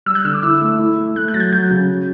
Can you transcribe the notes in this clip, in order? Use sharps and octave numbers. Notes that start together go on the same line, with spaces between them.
G3 E6
F#6
D3 E6
D6
E4 E6
A3
E4
A3
A3 F#6
F#6
F#3 A6
G6
F#3 G6
C#3
F#3